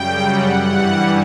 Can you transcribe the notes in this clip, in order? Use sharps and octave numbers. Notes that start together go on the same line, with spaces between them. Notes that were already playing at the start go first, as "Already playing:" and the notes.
Already playing: F#2 C#3 G3 G5
F#5
G2 E3 G3 F#5